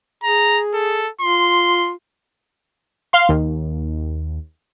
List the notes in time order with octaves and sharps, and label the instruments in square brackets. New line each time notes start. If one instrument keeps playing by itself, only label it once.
[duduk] G#4 [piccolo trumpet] A#5
[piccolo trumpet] A4
[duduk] F4 [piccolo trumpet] C6
[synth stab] F5 C6
D#2